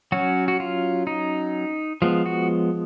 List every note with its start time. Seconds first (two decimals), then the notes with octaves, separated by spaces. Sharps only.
0.12 F#3 C#4 F#4
0.48 F#4
0.60 F4
1.07 D#4
2.02 F3 G#3 B3 F4
2.26 F#4